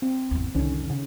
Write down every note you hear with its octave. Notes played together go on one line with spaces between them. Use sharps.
C4
G#1 E2
C2 F2 D3 D#3 C#4
C#3